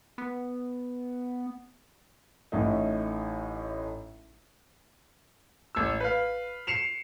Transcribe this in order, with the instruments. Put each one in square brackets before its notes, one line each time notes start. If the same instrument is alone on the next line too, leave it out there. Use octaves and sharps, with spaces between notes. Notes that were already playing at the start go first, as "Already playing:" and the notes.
[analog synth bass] B3
[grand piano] A1 A2 A3 D#4
A1 E6
B4 F5
C7 C#7 E7 F7